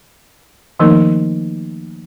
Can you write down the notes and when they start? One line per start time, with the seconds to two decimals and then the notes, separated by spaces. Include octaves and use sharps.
0.80 D#3 F3 A3 A#3 D#4 A#4